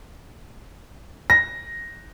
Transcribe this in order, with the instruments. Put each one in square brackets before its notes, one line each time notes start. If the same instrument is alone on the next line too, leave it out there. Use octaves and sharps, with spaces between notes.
[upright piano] A#6